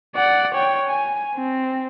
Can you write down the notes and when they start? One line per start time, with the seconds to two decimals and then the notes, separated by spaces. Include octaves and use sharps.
0.16 D5 F#5
0.54 C#5 G5
0.89 G#5
1.36 C4